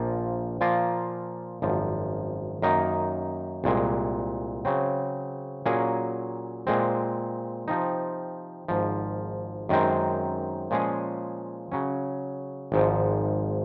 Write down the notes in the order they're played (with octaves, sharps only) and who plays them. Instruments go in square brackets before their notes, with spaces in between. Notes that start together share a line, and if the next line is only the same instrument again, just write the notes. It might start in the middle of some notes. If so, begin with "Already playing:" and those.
Already playing: [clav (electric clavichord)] A#1 A#2 F3 A#3 F4
A#2 F3 A#3 F4
G#1 F#2 F3
F#2 D#3 A#3 D#4
C2 A#2 G#3
C#3 F#3 C4
A#2 F#3 A#3 C#4 G#4
A#2 G#3 C4
C3 F3 C4 D#4
G#1 G#2 F3
F#2 D#3 G#3 C4
A#2 F3 G#3 C#4 G#4
C#3 F#3 C#4
G#1 G#2 F3